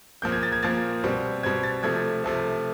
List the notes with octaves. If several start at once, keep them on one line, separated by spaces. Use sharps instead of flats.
A#2 F3 A#3 G6
G#6
A6
G#6
A#2 F3 A#3 A6
B2 G3 C4
B2 G3 C4 G#6
A6
C3 F3 A3 G#6
C3 F3 A3